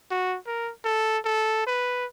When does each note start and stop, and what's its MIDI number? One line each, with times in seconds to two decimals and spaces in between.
0.11 0.37 66
0.47 0.72 70
0.85 1.18 69
1.25 1.65 69
1.67 2.06 71